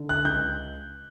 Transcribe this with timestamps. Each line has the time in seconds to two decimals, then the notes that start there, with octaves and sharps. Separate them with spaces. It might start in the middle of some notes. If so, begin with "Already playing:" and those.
Already playing: D3
0.09 F#6
0.25 C#2 G6